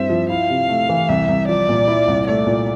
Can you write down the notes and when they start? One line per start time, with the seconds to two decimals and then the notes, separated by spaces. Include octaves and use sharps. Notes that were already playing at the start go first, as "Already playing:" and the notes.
Already playing: G2 C4 E4 E5
0.10 F3
0.30 E4 F5
0.49 C3
0.69 A3
0.89 E3
1.09 C2 E5
1.28 C2
1.48 F3 D5
1.69 A#2
1.88 E4
2.08 C2
2.27 A3 D5
2.47 A#2